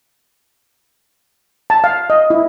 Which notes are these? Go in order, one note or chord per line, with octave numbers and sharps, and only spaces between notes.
A5
F5
D#5
E4